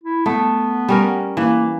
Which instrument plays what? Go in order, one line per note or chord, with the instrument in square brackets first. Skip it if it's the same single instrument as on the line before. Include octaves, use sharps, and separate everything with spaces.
[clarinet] E4
[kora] A3 [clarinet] B3
[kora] G3 C#4 A#4
[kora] E3 [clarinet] A#3